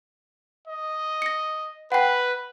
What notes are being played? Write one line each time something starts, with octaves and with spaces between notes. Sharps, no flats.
D#5
A#6 C#7
B4 F#5 G5